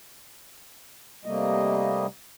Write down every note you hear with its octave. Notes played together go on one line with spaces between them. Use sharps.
C3 G3 A3 A#3 D#5